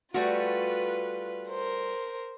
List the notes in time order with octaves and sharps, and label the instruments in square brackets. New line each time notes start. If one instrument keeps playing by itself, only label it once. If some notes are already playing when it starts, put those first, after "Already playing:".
[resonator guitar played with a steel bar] G3 A3 F#4 [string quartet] F4 B4
[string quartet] A#4 C5